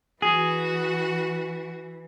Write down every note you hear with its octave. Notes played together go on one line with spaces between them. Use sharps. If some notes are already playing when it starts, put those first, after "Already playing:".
E3 F#4 G#4